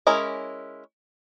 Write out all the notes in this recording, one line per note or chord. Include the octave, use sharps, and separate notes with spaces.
G#3 C#4 E4 A#4